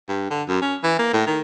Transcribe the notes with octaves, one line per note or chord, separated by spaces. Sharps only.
G2
D3
F#2
C#4
E3
A#3
A2
D#3